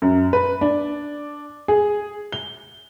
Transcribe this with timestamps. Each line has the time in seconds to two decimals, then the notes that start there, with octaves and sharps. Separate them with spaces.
0.02 F#2
0.33 B4
0.61 D4
1.68 G#4
2.32 G7